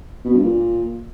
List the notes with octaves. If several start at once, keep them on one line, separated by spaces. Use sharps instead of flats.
B2
G2
A#2